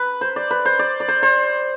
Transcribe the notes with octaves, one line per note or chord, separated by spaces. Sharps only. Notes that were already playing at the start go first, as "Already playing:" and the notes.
Already playing: B4
C5
D5
B4
C5
D5
D5
C5
C5